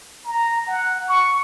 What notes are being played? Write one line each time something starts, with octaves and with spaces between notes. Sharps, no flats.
A#5
F#5
C#6